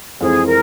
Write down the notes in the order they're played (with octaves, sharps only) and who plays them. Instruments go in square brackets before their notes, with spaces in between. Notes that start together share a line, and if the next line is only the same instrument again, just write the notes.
[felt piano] F2 E3 G#3 C4 [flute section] G#4
[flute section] A#4